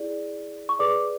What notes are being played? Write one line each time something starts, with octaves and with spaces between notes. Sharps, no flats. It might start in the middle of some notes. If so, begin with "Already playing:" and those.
Already playing: E4 G#4 D5
C#6
G#4 B4 D5 D6